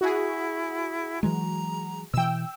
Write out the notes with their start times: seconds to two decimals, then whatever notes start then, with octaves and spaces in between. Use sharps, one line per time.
0.01 E4 F#4 G#4
1.23 E3 F#3 G#3 A#5
2.14 B2 E3 G5 E6